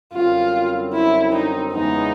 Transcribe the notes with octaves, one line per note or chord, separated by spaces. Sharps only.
F#2 D3 G3 C4 F4
E4
D#4
E2 C#3 E3 G#3 B3 D#4